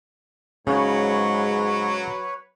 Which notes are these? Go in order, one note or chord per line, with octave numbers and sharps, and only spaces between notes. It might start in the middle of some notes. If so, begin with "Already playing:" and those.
G#2 C#3 F#3 B4 C#5